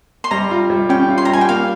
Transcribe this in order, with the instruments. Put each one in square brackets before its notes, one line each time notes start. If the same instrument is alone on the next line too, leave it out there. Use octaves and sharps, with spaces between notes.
[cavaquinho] C6
[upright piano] G3 [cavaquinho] A#5
[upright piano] F4
G3
[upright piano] C#4 [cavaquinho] G5
[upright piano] F4
[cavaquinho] C6
A#5
[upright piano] G3 [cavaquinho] G#5
[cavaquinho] G5
[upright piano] A#3 [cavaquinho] F5